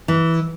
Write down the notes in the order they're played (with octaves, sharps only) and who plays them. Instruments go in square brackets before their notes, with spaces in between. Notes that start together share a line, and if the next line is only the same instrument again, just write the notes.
[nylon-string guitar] E3